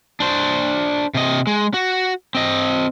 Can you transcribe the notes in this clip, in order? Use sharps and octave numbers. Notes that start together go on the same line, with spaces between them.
D4 C5
C3 D#5
G#3
F#4
C4 D#5